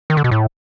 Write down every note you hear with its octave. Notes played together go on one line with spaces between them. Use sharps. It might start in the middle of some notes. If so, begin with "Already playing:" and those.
D#3
D3
B2
A2